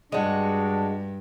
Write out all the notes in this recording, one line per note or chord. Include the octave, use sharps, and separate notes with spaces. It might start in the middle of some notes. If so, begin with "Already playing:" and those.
G2 G#3 D4 F#4